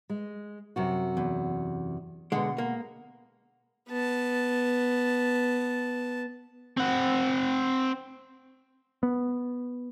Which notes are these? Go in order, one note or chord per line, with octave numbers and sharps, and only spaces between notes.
G#3
F#2 C3 F#4
E2
B2 D3 G#3 F#5
A#3
B3 A5
C4 F#5
B3